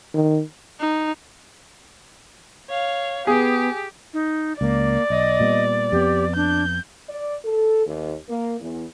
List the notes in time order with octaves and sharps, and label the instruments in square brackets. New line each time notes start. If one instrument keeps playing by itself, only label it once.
[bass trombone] D#3
[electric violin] D#4
[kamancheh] C#5 F5
[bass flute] B3 [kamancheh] G4 [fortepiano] G#4
[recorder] D#4
[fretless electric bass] C#2 [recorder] A#3 [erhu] D5
[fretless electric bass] B1 [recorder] D#5
[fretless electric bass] A#2 G3 B3
[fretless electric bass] F2 B3 [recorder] G4
[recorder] D4 [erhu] G6
[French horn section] D5
A4
D#2
A#3
E2